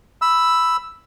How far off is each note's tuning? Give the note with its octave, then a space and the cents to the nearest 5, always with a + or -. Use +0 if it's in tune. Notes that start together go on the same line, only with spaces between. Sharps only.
B5 +0 E6 +0